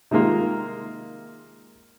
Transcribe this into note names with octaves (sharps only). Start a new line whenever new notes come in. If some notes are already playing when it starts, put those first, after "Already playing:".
C3 D#3 G#3 A#3 F4